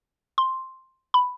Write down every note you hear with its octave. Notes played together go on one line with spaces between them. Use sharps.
C6
B5